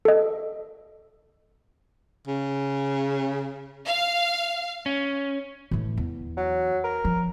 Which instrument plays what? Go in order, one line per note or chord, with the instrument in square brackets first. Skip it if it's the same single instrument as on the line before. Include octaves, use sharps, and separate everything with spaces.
[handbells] A4 D#5
[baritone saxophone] C#3
[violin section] F5
[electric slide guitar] C#4
[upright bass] A2 E3
E2
[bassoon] F#3
A#4
[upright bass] F3